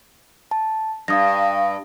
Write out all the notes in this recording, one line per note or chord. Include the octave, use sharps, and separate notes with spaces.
A5
G2 F5 D#6 A#6